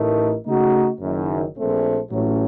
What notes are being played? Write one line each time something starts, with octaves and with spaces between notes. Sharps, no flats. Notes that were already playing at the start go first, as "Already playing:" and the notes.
Already playing: A1 A2 A3 D#4 A#4
C#3 A3 D#4 F#4
F#1 F#2 D#3
A#1 A#2 A3 C4
A1 A2 F#3 A3 C#4